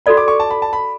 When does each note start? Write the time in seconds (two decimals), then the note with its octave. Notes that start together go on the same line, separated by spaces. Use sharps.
0.06 F#4 A4 D5 B5
0.17 D6
0.28 C#6
0.40 A5
0.51 B5
0.62 A5
0.73 B5